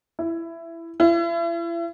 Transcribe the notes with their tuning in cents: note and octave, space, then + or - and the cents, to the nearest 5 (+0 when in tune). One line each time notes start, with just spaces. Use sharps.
E4 +15
E4 +40